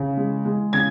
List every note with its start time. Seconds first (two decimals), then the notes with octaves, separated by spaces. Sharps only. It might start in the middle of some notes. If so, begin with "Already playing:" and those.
Already playing: C#3
0.17 G#3
0.45 G#3
0.73 C#3 G#6